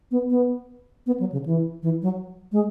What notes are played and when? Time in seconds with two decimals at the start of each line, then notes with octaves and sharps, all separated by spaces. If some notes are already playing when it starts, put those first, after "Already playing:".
0.11 B3
0.30 B3
1.06 B3
1.20 F#3
1.32 C#3
1.46 E3
1.83 E3
2.02 F#3
2.52 G#3